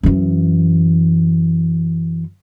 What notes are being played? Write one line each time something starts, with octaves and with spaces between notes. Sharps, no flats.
F#2 E3